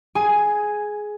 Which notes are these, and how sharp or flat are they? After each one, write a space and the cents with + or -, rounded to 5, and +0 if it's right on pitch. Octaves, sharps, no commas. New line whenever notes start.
G#4 +15 G#5 +0